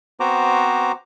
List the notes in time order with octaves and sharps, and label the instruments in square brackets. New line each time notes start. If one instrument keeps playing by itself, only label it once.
[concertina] B3 C4 F#4 C5 A#5 D6